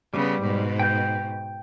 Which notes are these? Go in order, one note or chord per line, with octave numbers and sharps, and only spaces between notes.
C#3 G3 B3
G#2 B2
G5 G6